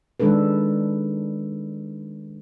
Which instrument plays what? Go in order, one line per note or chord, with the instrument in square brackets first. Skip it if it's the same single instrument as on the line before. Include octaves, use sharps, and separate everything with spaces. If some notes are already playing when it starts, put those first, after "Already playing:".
[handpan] D#3 G#3 D4 A4 B4